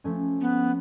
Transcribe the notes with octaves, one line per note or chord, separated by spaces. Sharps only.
F3 A3 C#4
B3